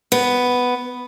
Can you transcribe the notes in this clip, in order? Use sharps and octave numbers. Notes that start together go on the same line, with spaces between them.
B3